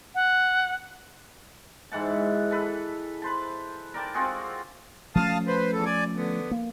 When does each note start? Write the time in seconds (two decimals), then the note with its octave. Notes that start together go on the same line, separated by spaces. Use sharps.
0.15 F#5
1.92 G#2 E3 F#5 A5
2.51 A4 B4
3.22 B4 C5 A5
3.94 A#4 D5 G5 A5
4.14 C4 F4 F#4 G#4
5.15 F3 A3 C#4 F5 A5 D#6
5.47 B4 C5
5.73 E2 A4
5.85 D5 G#5
6.16 D3 B3
6.51 A#3